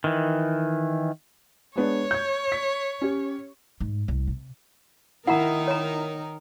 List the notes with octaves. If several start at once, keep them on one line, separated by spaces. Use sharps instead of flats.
D#3 E3
G#3 B3 D4 C#5
G6 G#6
B6
C#4 G4
G#2
C2
C3
D#3 D#4 E4 A#4 F#5 A#5
C#5 A#5